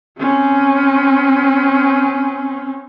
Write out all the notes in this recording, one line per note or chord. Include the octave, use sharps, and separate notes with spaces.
C4 C#4